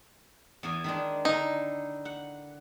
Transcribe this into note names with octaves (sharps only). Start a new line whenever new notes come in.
E2 E3 G#5
D#3 G#3 D4
D3 D#4 E4 A#5
F#5